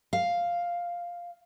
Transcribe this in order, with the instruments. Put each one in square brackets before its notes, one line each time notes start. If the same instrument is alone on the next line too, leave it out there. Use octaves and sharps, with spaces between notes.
[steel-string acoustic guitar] F5